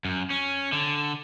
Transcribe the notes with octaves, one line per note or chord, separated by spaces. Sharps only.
F#2
C#4
D3